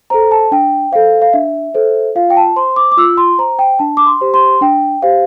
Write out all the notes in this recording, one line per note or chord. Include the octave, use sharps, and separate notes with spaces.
A4 C5 A#5
A5
D4 G5
A4 C5 F5
F5
D4 E5
A4 C5
F4 F5
G5
A5
C5 C6
D6
D6
F4 E6
C6
C5 A#5
G5
D4 A5
D6
C6
G4 C5
C6
D4 G5
G4 C5 F5